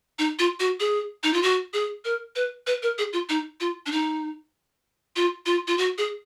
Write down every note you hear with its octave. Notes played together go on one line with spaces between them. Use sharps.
D#4
F4
F#4
G#4
D#4
F4
F#4
G#4
A#4
B4
B4
A#4
G#4
F4
D#4
F4
D4
D#4
F4
F4
F4
F#4
G#4